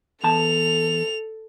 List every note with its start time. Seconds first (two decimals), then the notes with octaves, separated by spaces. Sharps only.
0.24 E2 A4 A5 F7